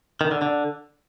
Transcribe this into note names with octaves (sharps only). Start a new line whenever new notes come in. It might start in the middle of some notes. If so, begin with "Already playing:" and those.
D#3
D3
D3